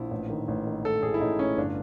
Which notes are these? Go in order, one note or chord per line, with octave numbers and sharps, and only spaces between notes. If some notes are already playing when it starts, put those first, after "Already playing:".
Already playing: A#1 E4
A1
D#3
A1
D#3
A1 A4
A1 G#4
E4
A1 D#4
A1 C#4
G1 D4